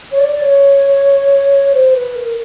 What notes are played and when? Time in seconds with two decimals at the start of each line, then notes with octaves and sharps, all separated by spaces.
0.12 C#5
0.19 D5
0.41 C#5
1.72 C5
1.94 B4
2.16 A#4